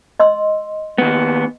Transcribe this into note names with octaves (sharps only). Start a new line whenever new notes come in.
D#5 C6 E6
D#2 B3